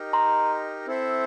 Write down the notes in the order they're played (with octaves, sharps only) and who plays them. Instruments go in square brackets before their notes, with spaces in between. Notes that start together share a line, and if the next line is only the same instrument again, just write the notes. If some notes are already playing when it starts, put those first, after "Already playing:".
Already playing: [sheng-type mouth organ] D#4 G4 A#4 D#5
[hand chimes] A#5 C6
[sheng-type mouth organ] C4 E4 A4 C5 E5